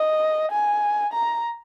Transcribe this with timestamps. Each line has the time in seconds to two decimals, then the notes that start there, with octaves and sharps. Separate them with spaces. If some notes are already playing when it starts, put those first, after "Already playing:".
Already playing: D#5
0.52 G#5
1.13 A#5